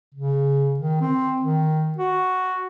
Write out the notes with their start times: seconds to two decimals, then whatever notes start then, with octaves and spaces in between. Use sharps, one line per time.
0.15 C#3
0.79 D#3
1.01 C4
1.42 D#3
1.98 F#4